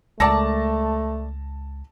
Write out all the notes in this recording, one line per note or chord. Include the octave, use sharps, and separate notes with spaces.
C#2 G#3 A3 A4 A#4 D5 A5 A#6